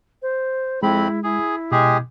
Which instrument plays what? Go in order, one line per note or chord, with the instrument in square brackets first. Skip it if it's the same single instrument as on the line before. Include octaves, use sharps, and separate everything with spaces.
[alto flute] C5
[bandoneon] F2 C4 B5 [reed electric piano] G#3 [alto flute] E4
[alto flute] E4 [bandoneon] G#4
[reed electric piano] B2 [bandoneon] G#3 G4 G#4